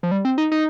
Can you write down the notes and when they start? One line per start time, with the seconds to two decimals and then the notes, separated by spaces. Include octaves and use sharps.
0.03 F3
0.11 G3
0.25 C4
0.38 D#4
0.52 D#4